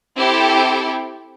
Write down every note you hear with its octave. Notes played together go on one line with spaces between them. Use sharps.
C4 E4 G4 A4